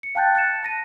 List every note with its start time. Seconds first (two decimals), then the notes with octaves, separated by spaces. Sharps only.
0.03 C#7
0.15 F5 G5 A5 F#6 G6 A6
0.35 F#6 A6 C#7 E7
0.63 A5 A#6 D#7